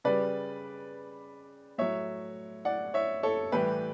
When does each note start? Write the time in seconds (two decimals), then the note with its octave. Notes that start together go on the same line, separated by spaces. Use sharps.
0.04 C#3 G3 B4 D5
1.78 A2 F#3 C#5 E5
2.65 D5 F#5
2.94 C#5 E5
3.23 A4 C#5
3.52 A2 E3 G3 G4 B4